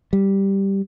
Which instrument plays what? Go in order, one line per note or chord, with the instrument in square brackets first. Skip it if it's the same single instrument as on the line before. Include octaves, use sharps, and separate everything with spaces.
[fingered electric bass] G3